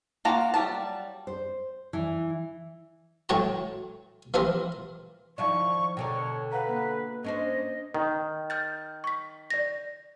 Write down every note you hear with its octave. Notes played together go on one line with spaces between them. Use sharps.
A#3 F4 F#4 A5 A#5
F#3 G3 A#4 A5
C5
E3
A2 F#3 C#5 G5 A5 A#5
E3 F3 C4 G4 A#4
D#3 F3 E4 D5 F5 C#6
B2 D3 A#4 C#5 G5
B4 F5 F#5 A#5
A#3
C#4 D4 C5 D#5
D#3
F6 G6 A6
C#6 B6
D5 A#6